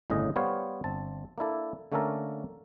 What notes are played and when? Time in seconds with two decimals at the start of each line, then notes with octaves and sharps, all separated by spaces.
0.10 G1 C2 A2 C#3 G#4 D#5
0.36 G3 B3 C5 C#5 F5
0.84 G1 C4 A5
1.38 A#3 D4 E4 A4
1.92 D3 A3 A#3 C#4 A4 A#4